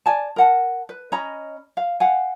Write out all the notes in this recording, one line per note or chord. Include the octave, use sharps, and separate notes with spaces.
D5 G#5 A5
A#4 F#5 A5
B4
C#4 D#5 A#5 B5
F5
F5 F#5 G#5